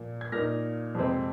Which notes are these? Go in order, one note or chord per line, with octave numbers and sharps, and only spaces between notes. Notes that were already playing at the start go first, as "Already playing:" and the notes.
Already playing: A#2 F3 A#3
G#6
A#2 A#3 D#4 F6 A#6
F2 C3 G#3 C4